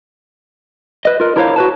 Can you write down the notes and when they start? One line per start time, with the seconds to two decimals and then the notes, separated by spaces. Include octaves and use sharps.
1.05 B4 D#5
1.20 F4 A#4
1.36 D4 E4 A#4 C5 C#5 F5
1.56 F#4 B4 A5